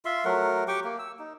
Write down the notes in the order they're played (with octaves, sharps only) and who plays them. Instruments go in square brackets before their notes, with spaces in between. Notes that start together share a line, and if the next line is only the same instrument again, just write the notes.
[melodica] F4 E5 C6
F#3 A3 A#4 F#5
G4 G5 C#6 D6
A#3
E6
D#4